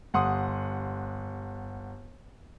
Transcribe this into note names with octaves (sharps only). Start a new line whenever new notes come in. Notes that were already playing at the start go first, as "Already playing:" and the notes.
G1 F#5 C6 D#6